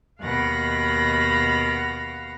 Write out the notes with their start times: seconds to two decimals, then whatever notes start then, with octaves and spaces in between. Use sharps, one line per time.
0.20 D#2 B2 F5 F#5 B5 A#6